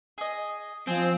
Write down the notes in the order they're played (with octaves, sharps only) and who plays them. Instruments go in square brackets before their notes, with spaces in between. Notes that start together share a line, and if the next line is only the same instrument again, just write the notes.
[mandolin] G#4 D#5
[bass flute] F3 [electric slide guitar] C4 [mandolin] G#4